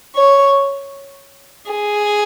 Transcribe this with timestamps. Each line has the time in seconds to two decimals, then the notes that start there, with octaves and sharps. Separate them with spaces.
0.15 C#5
1.71 G#4